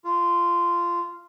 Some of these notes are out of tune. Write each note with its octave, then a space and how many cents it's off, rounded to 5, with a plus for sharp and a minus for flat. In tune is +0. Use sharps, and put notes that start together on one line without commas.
F4 -15